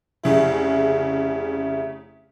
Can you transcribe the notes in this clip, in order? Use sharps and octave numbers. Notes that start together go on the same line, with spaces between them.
F1 C#3 E4